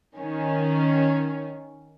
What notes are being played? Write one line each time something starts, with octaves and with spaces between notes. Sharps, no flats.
D#3 C#4